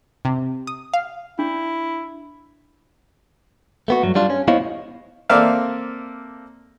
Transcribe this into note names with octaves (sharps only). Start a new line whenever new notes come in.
C3
D#6
F5
D4 E4
A3 B3 F#4
G2 F#3
G3 D4 F4
C#4
B3 E4 C5 C#5 D#5 F5
A#3 C4 A4 D5 E5 F5